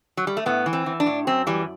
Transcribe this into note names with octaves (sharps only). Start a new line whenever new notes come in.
F#3
G3
A3
A2 B3
E3
C4
E3
D4
A2
F#2 C4
E3 G3